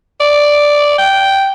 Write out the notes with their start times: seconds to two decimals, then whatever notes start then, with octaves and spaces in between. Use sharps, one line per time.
0.20 D5
0.98 G5